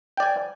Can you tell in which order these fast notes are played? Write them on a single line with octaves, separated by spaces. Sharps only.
G5 D5 G#5